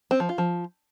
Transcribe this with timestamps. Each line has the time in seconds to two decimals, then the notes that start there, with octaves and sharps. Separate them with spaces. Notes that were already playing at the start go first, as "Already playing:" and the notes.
0.11 C4
0.20 F3
0.29 F4
0.38 F3